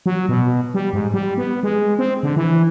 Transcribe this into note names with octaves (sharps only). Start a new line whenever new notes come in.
F#3
B2
G3
G#2
G3
B3
G#3
C4
D3
E3